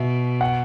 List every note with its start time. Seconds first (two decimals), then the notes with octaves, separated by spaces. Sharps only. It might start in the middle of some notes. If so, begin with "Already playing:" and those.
Already playing: B2 E5
0.41 F#5